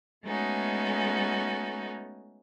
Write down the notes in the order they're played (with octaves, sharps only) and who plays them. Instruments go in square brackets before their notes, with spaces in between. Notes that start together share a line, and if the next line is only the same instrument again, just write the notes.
[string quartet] G#3 A3 B3 C#4 D#4 F#4